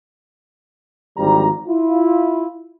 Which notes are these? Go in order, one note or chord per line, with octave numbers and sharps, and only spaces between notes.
G#1 D3 F3 G3 A#5
E4 F4